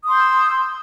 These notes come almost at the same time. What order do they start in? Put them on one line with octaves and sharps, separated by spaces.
D#6 C6 G6 E6